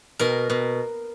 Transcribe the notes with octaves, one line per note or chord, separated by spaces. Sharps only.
B2 A#4
B2